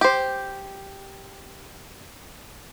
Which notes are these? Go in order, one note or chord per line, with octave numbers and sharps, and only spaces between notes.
G4 C5